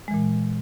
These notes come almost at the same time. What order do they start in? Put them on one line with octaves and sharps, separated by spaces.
G#3 E3 A#2